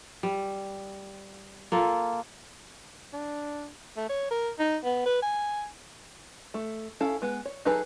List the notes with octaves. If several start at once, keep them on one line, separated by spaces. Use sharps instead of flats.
G3
A#3 F4 A4
D4
A3
C#5
A#4
D#4
B3
B4
G#5
A3
C#4 E4 A4 F5
G#3 B3
C#5
F#3 D#4 G#4 A4 B4